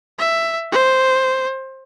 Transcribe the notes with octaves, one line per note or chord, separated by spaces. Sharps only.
E5
C5